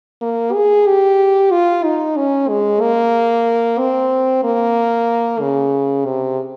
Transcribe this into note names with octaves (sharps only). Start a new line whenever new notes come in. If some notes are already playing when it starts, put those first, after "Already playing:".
A#3
G#4
G4
F4
D#4
C#4
G#3
A#3
C4
A#3
C#3
C3